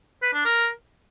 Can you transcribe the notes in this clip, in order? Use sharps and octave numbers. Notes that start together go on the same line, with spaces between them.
B4
D4
A#4